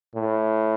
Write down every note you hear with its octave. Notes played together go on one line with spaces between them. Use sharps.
A2